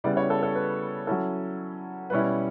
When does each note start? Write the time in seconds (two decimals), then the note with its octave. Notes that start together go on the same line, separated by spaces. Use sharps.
0.04 C#3 G3 B3 E4 D5
0.17 C#5
0.30 A4
0.43 A4
0.55 B4
1.07 F#3 C#4 E4 A4
2.10 B2 G3 C#4 E4 B4